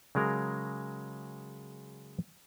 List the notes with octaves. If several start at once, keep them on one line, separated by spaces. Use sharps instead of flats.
C#3 F#3 G#3 A#4